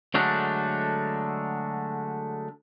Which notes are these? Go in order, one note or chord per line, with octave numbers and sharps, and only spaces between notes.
D3 F#3 G#3 A3 D4